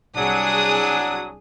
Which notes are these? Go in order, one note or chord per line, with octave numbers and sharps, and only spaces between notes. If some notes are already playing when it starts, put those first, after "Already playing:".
C2 F#3 D4 G#4 D#6